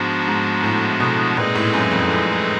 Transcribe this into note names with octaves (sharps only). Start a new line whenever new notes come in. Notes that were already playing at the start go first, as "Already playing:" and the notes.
Already playing: G#2 F3 G#3 B3 D4 F#4
G#2
A2
B2
A#2 G#3 C4 D#4 G#4 B4
A2
F#2
F2
F2